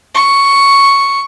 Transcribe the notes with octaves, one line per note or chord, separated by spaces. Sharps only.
C#6